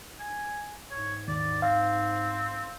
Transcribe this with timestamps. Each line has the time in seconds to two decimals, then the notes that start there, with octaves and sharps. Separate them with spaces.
0.19 G#5
0.91 G#2 C#5
1.28 D#2 D5
1.62 C4 F5